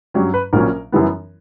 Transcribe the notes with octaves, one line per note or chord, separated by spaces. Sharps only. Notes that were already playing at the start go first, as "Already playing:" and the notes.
G2 F#3 C#4 G4
B4
A#1 A#2 F#3 C#4 A#4
F#2 E3 G3 B3